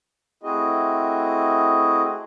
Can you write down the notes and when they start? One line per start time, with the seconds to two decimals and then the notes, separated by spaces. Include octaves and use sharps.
0.43 A3 C4 E4 F#4 G#4 D#5